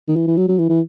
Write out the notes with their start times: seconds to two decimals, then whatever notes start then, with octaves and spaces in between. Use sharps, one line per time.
0.08 D#3
0.16 E3
0.27 E3
0.37 F#3
0.48 F#3
0.58 E3
0.69 E3